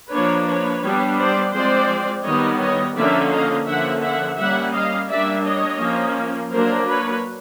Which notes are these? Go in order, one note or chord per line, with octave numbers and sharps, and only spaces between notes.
F3 A#3 D4 B4 C#5
B4 C#5
G3 B3 D4
C5 D5
F3 G#3 C4 C5 D5
D#3 G3 B3 C#5 D#5
C#5 D#5
D3 F3 A#3 C#4 D5 E5
D#5 F5
D3 F3 A#3 C#4 E5 F#5
E5 F#5
G3 A#3 C#4 E5 F#5
D#5 F5
G3 A#3 D4 D5 E5
C#5 D#5
F3 A#3 C#4
F#3 A#3 D4 A#4 C5
B4 C#5